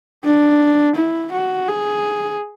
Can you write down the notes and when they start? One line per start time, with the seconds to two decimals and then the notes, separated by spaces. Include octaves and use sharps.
0.24 D4
0.96 E4
1.33 F#4
1.68 G#4